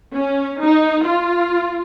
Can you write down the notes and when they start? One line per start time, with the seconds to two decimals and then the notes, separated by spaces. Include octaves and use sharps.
0.16 C#4
0.62 D#4
1.07 F4